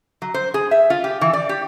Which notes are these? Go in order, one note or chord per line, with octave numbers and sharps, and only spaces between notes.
F#3
C5
G#4
E5
F4
G4
E3
D5
G4